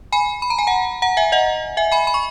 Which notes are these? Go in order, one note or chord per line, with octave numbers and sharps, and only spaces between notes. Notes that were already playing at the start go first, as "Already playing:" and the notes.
G#5 B5
B5
A#5
G#5
F#5 A#5
F#5 A#5
E5 G#5
D#5 F#5
E5 G#5
G#5 B5
B5
C#6